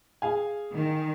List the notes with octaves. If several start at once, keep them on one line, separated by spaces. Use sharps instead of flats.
G#4 F5 G#5
D#3